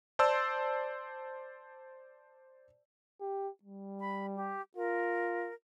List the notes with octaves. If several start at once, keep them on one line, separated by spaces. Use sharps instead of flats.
C5 D5 A5 C6 E6
G4
G3
B5
G4
F4 A#4